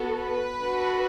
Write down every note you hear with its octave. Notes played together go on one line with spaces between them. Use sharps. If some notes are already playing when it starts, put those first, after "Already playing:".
Already playing: B3 F#4 A4
B4
D4 F#4 A4